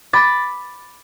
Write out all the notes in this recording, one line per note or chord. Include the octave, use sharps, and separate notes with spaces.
B5 D6 A6